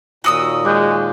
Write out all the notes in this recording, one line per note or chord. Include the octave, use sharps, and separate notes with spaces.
D#2 A#2 F#4 D#6 E6
G#3 D6 F#6 G6